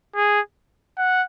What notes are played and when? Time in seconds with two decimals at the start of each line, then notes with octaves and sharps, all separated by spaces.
0.16 G#4
0.98 F#5